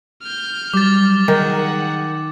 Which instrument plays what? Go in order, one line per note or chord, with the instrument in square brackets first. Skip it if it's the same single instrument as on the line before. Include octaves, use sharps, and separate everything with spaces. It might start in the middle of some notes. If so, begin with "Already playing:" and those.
[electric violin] F6 G6
[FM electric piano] F#3 G3 [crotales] D6 A6
[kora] D#3 [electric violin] G#4 F#5